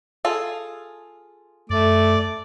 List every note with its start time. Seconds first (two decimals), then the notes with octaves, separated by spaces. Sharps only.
0.25 F4 G#4 A4
1.70 F#2 A3 D5